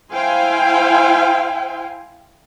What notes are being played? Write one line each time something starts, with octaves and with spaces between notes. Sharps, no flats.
E4 C5 F5 G5 G#5